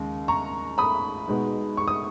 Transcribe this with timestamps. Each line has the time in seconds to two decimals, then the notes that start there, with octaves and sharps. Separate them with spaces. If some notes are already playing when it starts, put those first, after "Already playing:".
Already playing: D#2 C#3 G#3
0.28 A#5 C#6
0.78 B5 D#6
1.28 B2 G#3 D#4
1.77 C#6
1.88 D#6